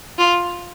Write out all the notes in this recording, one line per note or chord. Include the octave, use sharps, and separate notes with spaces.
F4